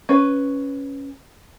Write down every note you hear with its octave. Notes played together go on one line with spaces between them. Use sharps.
C#4 B4